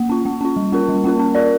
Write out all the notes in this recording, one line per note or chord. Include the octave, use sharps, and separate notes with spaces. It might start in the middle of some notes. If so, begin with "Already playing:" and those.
Already playing: A#3
C#4 F4
A#3
C#4 F4
G3
A#3 C#4 F4 A#4
G3
A#3 C#4 F4 A#4
C#4
F4 A#4 D5